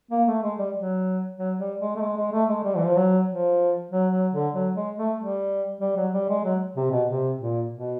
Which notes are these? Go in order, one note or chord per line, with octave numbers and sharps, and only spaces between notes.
A#3
A3
G#3
G3
F#3
F#3
G3
G#3
A3
G#3
G#3
A3
G#3
G3
E3
F3
F#3
F3
F#3
F#3
D3
F#3
G#3
A3
G3
G3
F#3
G3
G#3
F#3
C3
B2
C3
A#2
B2